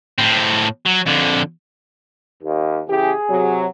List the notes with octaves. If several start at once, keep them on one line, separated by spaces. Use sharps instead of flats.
A2 C4
F#3
F2 D3
D#2
C#3 E3 G4 G#4
C3 F#3